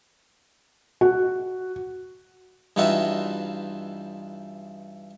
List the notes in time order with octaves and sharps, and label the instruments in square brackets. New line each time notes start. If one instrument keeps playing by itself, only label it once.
[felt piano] F#4
[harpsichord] G2 E3 D#4 F4 F#4 E5